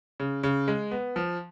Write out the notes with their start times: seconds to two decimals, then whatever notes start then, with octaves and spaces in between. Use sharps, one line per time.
0.20 C#3
0.43 C#3
0.68 G#3
0.91 B3
1.16 F3